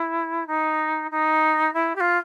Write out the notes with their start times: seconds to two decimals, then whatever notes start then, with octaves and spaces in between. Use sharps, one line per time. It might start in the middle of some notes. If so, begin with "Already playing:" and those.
Already playing: E4
0.47 D#4
1.11 D#4
1.73 E4
1.95 G4
2.00 F4